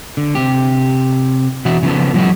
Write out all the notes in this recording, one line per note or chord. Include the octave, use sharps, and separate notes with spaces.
D3
C3 G4
B2 E3 F#4 E5 F#5
C#3 F3 B3 A4
A#2 E3 F#3 G#3 B3 F#4